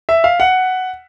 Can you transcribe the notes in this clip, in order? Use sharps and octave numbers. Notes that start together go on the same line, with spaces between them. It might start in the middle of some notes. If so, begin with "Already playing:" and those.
E5
F5
F#5